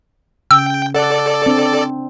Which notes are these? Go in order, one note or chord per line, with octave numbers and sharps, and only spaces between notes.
C#3 G5 E6
A4 D5 F#5
C4 D4